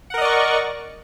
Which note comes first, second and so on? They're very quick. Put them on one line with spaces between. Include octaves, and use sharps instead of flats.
F#5 A#4 D#5 D5 C#6